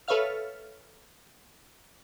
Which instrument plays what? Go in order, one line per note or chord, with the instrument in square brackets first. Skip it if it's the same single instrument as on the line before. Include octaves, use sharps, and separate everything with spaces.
[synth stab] A4 B4 C#5 E5 F5 F6